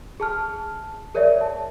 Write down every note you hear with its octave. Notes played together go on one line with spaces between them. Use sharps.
G#4 A5 F6
G#4 A#4 C#5 D5 E5
A5